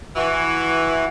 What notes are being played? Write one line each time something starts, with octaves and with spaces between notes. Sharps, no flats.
E3 F#4